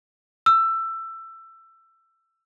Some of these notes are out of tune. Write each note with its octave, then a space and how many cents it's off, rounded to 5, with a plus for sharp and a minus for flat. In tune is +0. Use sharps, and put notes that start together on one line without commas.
E6 +20